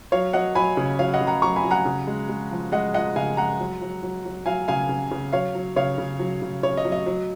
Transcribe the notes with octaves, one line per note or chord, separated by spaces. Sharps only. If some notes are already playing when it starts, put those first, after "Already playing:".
F#3 C#5 F5
F#3 D#5 F#5
F#3 G#5 B5
C#3
F#3 C#5 F5
D#5 F#5
C#3
F#5 A#5
F#3 A#5 C#6
G#5 B5
F#3
F#5 A#5
C#3
G#3
G#3
F3
G#3 D#5 F#5
F3 D#5 F#5
C#3 F5 G#5
G#3 F#5 A#5
F#3
F#3
F#3
F#3
F#3 F5 G#5
C#3 F5 G#5
C#3
C#3
F#3 C#5 F5
F#3
C#3 C#5 F5
C#3
F#3
C#3
C#3 C#5
D#5
F#3
D#5
F#3